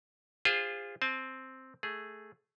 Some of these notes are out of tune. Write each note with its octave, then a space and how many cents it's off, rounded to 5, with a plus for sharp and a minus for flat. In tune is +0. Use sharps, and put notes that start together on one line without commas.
F4 +0 G#4 -35 C5 -5
C4 +0 A5 -35
A3 +0 G#4 +0